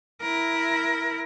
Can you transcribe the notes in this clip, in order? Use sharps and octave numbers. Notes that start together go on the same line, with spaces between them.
E4 A#4